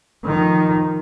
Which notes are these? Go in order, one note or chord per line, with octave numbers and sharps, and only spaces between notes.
D#3 F3